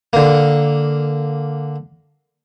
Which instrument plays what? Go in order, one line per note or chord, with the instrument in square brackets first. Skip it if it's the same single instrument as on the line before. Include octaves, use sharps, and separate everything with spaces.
[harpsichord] D3 A#3